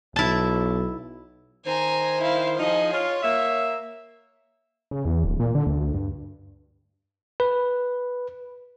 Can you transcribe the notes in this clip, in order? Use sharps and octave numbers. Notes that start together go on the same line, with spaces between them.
B1 E4 A5
D#3 C5 G#5 A#5
E4 F5
F3 D#4 G#4 D#5
F4 C#5
A#3 E5
C#3
E2
D1
A#2
D3
D2
D2
G2
B4